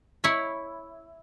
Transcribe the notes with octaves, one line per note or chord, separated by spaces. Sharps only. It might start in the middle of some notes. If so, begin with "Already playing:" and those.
E4 C#5 B5